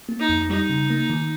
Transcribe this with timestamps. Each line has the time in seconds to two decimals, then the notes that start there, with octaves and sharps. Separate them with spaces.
0.09 A#3
0.20 D#4
0.29 F2
0.50 G3 D#4
0.70 C#3
0.90 A#3
1.10 D#3